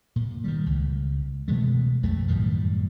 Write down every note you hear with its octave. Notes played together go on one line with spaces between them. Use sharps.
A#2
D#3 F3 G3
C#2
B2 E3 G#3 A3
B1 F2 A3
F#2 A2 D#3 G3